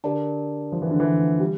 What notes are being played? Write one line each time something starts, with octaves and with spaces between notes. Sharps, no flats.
D3 G4 A#4 D5 A5
F3
E3
D3
E3
G3